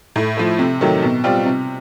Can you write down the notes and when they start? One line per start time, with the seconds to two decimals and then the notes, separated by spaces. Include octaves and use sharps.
0.16 A2
0.37 F3 A3
0.59 C3
0.81 D#3 F#3 A3
1.02 B2
1.24 G3 C4 F4
1.46 C3